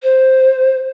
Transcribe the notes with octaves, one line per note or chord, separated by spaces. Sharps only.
C5